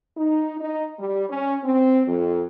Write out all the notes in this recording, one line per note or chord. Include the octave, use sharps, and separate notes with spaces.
D#4
D#4
G3
C#4
C4
F2